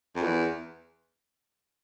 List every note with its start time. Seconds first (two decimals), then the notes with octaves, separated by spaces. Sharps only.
0.16 F2
0.23 E2